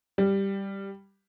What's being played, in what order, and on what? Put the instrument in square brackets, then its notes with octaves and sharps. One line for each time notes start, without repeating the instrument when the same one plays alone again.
[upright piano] G3